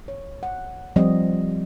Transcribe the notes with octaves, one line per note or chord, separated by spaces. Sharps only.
C#5
F#5
F3 G3 C4 D#5